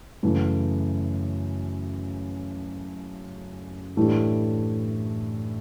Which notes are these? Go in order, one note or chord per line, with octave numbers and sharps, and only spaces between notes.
F#2 C#3 E3 A3
A2 E3 A3 D4 G4